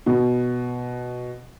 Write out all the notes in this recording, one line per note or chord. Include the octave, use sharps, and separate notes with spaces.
B2